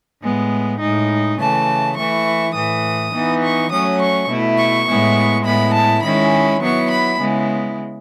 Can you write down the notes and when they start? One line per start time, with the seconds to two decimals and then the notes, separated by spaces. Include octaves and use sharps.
0.22 A2 G#3 B3
0.80 A2 G#3 D#4
1.39 C#3 E3 A3 A5
1.97 E3 A3 E4 C#6
2.55 A2 E3 A3 D#6
3.13 E3 B3 D#4
3.43 C#6
3.71 F#3 A3 C#4 D#6
4.00 C#6
4.28 B2 A3 E4
4.58 C#6
4.87 A2 G#3 B3 E4
5.44 A2 G#3 B3 E4 B5
5.74 A5
6.03 D#3 G#3 C#4 E4 B5
6.61 F#3 B3 E4 C#6
6.90 B5
7.20 C#3 G#3 B3 E4